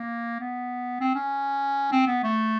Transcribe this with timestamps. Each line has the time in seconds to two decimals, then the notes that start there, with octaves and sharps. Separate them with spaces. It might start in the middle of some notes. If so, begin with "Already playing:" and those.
Already playing: A#3
0.40 B3
1.01 C4
1.15 C#4
1.92 C4
2.07 B3
2.23 A3